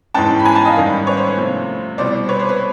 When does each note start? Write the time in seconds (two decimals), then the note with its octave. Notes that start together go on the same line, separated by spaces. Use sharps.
0.14 G#2 E3 G#3 C#4 G5 A5
0.39 B5
0.45 G#5 A#5
0.55 A5 B5
0.65 D#5 F5
0.76 G#2 D#3 G3 A#3 C#4
1.07 B4 C#5
1.17 C5
1.27 B4
1.37 C3 F3 A3 C#4
1.98 C2 B2 G3 C4 C5 D5
2.29 B4 C#5
2.39 C5
2.49 B4